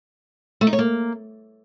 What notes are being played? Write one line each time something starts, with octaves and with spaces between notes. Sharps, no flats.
A3
D#4
C#5
A#3